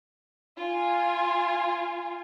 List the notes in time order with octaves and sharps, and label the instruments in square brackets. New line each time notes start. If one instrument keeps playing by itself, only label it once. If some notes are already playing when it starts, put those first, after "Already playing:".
[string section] F4 G#5